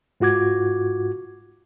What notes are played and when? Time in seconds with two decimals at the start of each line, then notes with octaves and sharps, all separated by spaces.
0.20 G#2 F4 F#4 D6 G#6